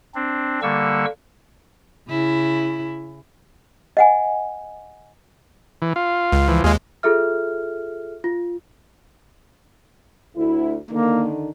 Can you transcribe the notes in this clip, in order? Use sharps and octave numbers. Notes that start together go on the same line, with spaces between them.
C4 D4
D3 G3 A#3 C#6 E6
C#3 E4
D#5 F#5 G#5
E3
F4
C#2
E3 F3
D#2 G#3 F4 G#4
F4 G#4 A4 E5 F6
F4
D2 E4
D3 D#3 A#3 D4